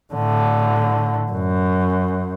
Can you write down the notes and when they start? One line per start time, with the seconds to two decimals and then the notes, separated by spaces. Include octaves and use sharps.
0.13 A2 D3
1.32 F#2